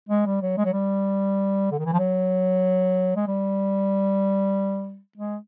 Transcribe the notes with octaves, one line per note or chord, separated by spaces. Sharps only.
G#3
G3
F#3
G#3
F#3
G3
D3
D#3
E3
F3
F#3
G#3
G3
G#3